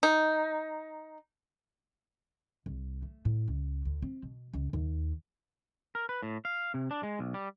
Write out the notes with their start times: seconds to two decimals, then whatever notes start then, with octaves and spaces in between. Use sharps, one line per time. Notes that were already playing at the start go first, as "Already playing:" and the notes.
0.03 D#4
2.66 C2
3.02 A3
3.25 A2
3.48 C#2
3.85 D2
4.02 C4
4.23 B2
4.54 C#2
4.73 D#2
5.95 A#4
6.09 B4
6.22 A2
6.45 F5
6.74 C3
6.91 D4
7.03 G#3
7.19 B1
7.34 G3